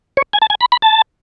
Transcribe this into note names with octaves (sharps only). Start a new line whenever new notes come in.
C#5
G#5
A5
G#5
B5
B5
A5